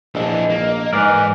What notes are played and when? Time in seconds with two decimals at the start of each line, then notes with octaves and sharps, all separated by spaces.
0.15 A#1 E3 D4 D#5
0.50 A#3
0.93 G#2 E3 A#4 D5 F5